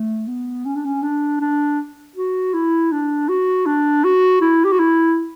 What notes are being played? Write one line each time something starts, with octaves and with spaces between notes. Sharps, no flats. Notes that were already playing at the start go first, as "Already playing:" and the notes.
Already playing: A3
B3
C#4
D4
C#4
D4
D4
F#4
E4
D4
F#4
D4
F#4
E4
G4
F#4
E4